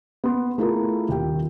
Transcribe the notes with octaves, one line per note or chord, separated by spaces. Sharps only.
B3 C6
A3 E4 F4 G#4 A#4
D#1 G4 G5